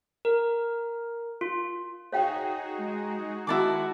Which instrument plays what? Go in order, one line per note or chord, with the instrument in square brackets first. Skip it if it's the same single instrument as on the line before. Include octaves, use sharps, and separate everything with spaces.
[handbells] A#4
F4
[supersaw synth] D#4 F#4 G#4 [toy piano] C#5 F5 G5
[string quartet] G#3
[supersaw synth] D#3 G#3 [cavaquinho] E4 A5 D6 [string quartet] F#4